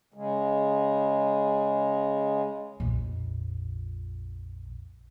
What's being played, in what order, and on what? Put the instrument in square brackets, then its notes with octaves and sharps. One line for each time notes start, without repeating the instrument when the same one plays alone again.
[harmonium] C#3 G#3
[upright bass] A#1 F2